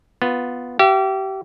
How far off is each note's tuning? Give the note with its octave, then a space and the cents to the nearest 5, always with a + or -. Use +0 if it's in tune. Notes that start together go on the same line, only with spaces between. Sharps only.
B3 +0 F4 +10
G4 -30 E5 +40